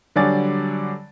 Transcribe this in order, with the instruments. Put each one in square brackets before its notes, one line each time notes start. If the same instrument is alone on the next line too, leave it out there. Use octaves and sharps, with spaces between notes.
[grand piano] D3 F#3 G3 D5 G#5 A6